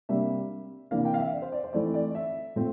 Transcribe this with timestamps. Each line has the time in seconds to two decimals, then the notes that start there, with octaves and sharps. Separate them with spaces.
0.09 C3 G3 A#3 D4 E5
0.91 C3 E3 A#3 D4 F5
1.05 G5
1.14 F5
1.18 E5
1.32 D5
1.42 C5
1.52 D5
1.64 C5
1.73 E3 A3 C4 D5
1.94 D5
2.15 E5
2.56 A#2 A3 C4